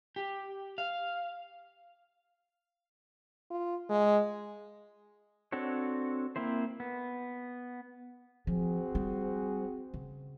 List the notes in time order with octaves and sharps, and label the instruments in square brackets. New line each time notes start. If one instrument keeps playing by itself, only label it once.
[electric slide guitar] G4
F5
[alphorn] F4
G#3
[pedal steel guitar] C4 D4 F#4 A4 C#5
A#3 C4 E4 C5
B3
[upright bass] F3 [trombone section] C4 F#4 G#4
[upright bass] G3
C#3